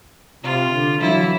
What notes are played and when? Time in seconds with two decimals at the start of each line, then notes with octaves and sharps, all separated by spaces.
0.43 C3 F4
0.72 D3
1.00 E3 F#3 E4